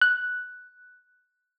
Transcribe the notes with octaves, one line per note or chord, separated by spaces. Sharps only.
F#6